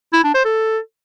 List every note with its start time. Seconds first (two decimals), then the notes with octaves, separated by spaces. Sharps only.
0.13 E4
0.24 D4
0.34 C5
0.45 A4